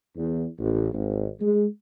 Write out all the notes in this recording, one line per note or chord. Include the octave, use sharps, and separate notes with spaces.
E2
A1
G#1
G#3